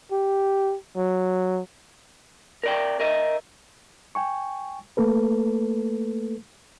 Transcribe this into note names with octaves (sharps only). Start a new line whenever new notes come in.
G4
F#3
A#4 D5 G5
A#4 D#5 E5
G5 G#5 C#6
A3 A#3 A4 B4